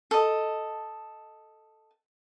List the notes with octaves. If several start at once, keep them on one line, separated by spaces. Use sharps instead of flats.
A4 D#5